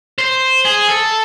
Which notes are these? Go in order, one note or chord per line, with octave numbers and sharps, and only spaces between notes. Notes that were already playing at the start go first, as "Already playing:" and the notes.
C5
G#4
A4